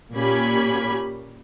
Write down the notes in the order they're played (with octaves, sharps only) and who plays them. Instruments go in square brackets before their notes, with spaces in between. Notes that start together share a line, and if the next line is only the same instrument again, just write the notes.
[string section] A#2 A#3 C#4 G4 B5 G#6